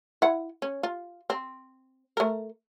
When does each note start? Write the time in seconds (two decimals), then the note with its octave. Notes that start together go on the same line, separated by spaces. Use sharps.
0.22 E4 F#5
0.62 C#4
0.83 F4
1.30 C4
2.17 A3 A#4